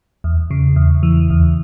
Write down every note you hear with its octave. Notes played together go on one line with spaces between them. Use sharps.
E2
C#3
E2
E3
E2